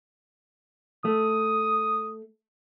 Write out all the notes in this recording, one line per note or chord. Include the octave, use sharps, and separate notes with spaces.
A3 D#6